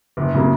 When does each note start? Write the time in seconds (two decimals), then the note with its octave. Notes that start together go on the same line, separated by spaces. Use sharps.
0.17 F#1
0.34 C#3 F#3 A#3